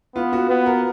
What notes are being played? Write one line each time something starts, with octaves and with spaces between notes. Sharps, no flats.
B3 F4
F#4
B3
A#4